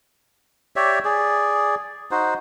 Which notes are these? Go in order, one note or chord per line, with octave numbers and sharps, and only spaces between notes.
G4 C#5 D5 E5
G#4 D5
D#4 F#4 C5